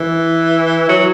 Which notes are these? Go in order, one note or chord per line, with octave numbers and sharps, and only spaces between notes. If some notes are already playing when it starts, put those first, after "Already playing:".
Already playing: E3
F#3